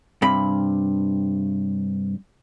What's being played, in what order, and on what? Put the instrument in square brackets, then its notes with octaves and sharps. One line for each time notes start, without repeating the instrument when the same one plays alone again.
[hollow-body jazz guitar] G2 C3 B5